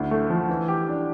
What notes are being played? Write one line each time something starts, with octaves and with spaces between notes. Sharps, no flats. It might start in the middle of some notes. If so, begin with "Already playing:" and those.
Already playing: D2 E4
A3
F3
E3
G4
D4